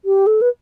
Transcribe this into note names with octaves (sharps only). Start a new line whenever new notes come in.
G4
A4
B4